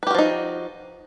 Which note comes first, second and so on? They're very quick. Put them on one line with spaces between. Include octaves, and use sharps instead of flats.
B4 G4 F#4 F3 D#4